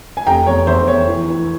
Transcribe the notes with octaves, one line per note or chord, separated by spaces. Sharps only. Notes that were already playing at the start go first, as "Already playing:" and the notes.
G#5
F1 G5 A#5
E2 C#5
E2 C5 E5
E2 C#5
E3
E3